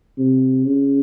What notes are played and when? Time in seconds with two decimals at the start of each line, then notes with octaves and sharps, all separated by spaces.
0.19 C3
0.65 C#3